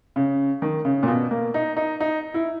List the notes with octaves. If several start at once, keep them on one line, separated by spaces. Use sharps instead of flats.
C#3
D#3
C#3
A#2
B2
A#3
D#4
D#4
D#4
E4